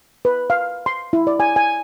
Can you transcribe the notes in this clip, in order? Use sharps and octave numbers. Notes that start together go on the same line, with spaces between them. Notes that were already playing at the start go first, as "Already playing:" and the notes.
B4
F5
C6
E4
D5
G#5
G#5